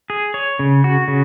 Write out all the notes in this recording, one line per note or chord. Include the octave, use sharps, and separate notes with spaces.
G#4
C#5
C#3
F#4
C#3